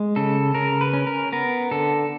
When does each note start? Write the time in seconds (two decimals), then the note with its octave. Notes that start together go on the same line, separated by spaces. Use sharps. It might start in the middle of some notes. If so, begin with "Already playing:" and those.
Already playing: G#3
0.16 C#3 A4
0.55 C#3 A#4
0.81 B4
0.93 C#4
1.07 A#4
1.32 B3 A#4
1.71 D3 A4